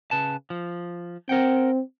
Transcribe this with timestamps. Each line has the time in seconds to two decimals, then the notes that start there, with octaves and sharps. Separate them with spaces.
0.11 C#3 B4 A5
0.50 F3
1.29 C4 A#4 F#5 G5